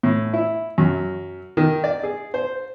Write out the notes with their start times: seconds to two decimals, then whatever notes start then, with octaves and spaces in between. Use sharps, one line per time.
0.03 A2
0.33 E4
0.78 F#2
1.57 D#3
1.84 D5
2.03 G#4
2.34 C5